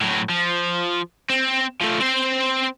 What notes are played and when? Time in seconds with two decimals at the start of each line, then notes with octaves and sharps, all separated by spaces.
0.01 A2 F#3
0.29 F3
1.30 C4
1.82 F3 A3
2.01 C4 C5